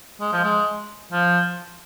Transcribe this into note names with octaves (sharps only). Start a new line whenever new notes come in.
G#3
F3
G#3
F3